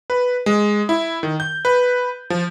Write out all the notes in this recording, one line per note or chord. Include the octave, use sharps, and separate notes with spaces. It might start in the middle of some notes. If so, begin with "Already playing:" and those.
B4
G#3
E4
D#3
G6
B4
F3